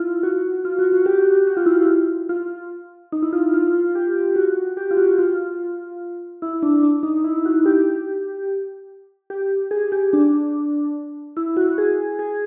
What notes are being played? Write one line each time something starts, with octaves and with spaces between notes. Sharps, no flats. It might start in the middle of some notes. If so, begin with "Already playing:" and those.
Already playing: E4 F4
F#4
F4
F#4
F#4
G4
F#4
F#4
F4
E4
F4
F4
D#4
E4
F4
F4
G4
F#4
G4
F4
F#4
F4
E4
D4
D4
D#4
E4
F#4
G4
G4
G#4
G4
D4
E4
F#4
G#4
G#4